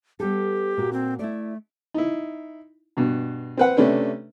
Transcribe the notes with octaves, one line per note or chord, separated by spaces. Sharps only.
G3 B3 G4 A4
A#2 A#3 F#4
C4
A3 E4 D5
D#4 E4
G2 B2
C4 B4 F#5
C3 A3 C#4 D4 B4